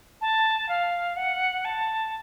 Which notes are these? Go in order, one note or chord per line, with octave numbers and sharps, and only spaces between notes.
A5
F5
F#5
A5